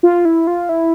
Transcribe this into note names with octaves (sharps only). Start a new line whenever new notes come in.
F4
E4
F4
E4